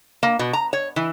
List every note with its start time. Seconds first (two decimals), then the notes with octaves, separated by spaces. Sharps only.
0.23 A#3
0.39 B2
0.53 A#5
0.73 C#5
0.96 E3